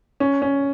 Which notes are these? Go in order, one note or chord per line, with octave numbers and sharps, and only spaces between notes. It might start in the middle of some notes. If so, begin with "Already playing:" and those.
C#4
C#4